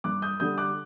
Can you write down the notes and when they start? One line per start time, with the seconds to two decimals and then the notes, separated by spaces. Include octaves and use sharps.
0.04 G2 D6 F#6
0.22 D#6 G6
0.40 D3 G3 D#6 G6
0.58 D6 F#6